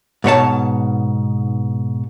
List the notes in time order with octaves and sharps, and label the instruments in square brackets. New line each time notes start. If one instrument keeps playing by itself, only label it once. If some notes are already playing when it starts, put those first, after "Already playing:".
[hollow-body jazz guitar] G#2 B2 C#5 A5